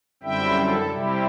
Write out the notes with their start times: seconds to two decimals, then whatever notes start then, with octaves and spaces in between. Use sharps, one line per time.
0.23 F#2 D3 G3 C4 E4 E5 G5
0.56 A4
0.89 C3 G3 C4 E4 G4